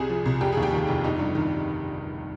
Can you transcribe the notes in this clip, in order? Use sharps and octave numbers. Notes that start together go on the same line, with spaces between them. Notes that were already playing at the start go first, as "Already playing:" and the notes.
Already playing: C2 C3 G#4
F3
C2
F1 G4
D#2 G#4
G4
D#3
F1
G1 D#4
G2
D#3